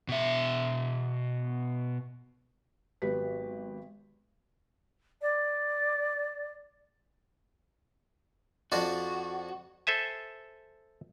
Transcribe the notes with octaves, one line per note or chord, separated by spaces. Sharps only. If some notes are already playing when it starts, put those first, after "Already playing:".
B2 E5
G#1 F#3 B3 G4 B4 B6
D5
F2 C4 D4 F#4
A4 C5 E5 G#5